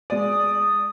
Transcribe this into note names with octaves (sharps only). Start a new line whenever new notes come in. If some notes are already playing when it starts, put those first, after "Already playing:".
G#3 D5 D#6